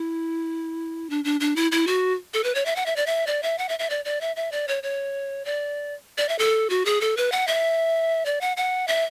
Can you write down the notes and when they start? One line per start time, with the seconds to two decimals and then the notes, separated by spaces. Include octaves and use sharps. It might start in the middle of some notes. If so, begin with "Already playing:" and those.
Already playing: E4
1.10 D4
1.24 D4
1.40 D4
1.56 E4
1.72 E4
1.87 F#4
2.34 A4
2.44 B4
2.55 C#5
2.66 E5
2.76 F#5
2.86 E5
2.96 D5
3.06 E5
3.27 D5
3.43 E5
3.58 F#5
3.69 E5
3.79 E5
3.90 D5
4.05 D5
4.21 E5
4.36 E5
4.52 D5
4.68 C#5
4.83 C#5
5.45 D5
6.18 D5
6.29 E5
6.39 A4
6.70 F#4
6.85 G#4
7.01 A4
7.17 B4
7.32 F#5
7.48 E5
8.26 D5
8.41 F#5
8.57 F#5
8.88 E5